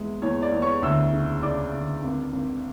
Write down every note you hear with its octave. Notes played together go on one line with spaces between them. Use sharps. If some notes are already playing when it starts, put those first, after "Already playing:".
Already playing: E2 G#3 E4
E2 C#5
D5
E2
C#5 C#6
D2 E5 E6
C#3
C#3 D5 D6
D2
G#1
G#1